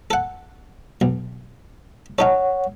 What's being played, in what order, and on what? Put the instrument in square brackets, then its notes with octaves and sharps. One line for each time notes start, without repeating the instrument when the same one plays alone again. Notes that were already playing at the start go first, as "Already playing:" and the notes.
[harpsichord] A4 F#5
B1
[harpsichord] C#4 D#4 A4 [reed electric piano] C#5 F#5